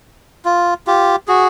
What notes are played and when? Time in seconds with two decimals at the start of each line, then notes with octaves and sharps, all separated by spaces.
0.45 F4
0.87 F4 G4
1.28 F#4 G#4